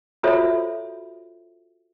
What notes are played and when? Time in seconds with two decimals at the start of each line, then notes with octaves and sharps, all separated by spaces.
0.23 F4 F#4 A4 C5 C#5 E5